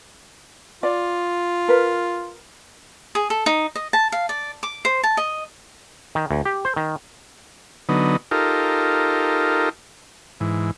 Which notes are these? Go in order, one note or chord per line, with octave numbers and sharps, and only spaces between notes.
F4 D5
A#4 B4
G#4
A4
D#4
D#5
A5
F5
D5
D6
C5
A5
D#5
D#3
D2
G4
C5
D#3
D3 F#3 B3 D#4
D#4 F4 G4 A4 A#4
G#2 E3